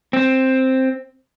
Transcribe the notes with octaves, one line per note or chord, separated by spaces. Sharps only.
C4